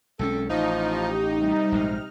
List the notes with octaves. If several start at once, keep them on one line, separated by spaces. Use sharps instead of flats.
B1 G#3 C4 C#4 A4
A1 F3 D#4
G4
C3 G3
A#1 G#2 G#3 F6